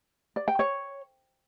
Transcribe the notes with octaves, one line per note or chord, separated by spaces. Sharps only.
D5
G5
C#5